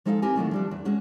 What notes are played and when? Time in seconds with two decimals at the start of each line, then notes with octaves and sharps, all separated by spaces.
0.05 F3 G#3 D#4 A4 E5 F5
0.22 C4 E4 G4 A#4 G#5
0.36 D#3 F#3 A3 D4
0.51 F3 G3 D4
0.71 E2
0.85 G#3 C#4 F#4 G#4